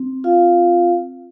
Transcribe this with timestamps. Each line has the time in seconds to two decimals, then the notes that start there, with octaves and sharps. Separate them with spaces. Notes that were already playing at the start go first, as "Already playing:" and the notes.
Already playing: C4
0.24 F4 F5